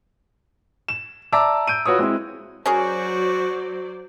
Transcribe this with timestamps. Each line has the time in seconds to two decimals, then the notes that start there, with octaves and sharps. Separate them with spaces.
0.88 E7
1.33 D5 E5 A5 A#5 D6 E6
1.67 G6 D7 D#7
1.86 F4 F#4 B4 C#5 D#6
1.99 G#3 C4 E4
2.66 F#3 C#4 F#4 G#4 A#4 C5 D5